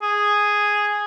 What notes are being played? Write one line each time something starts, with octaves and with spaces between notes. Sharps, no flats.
G#4